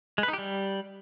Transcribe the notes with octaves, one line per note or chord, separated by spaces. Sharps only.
G#3
B4
D#4
G4
G3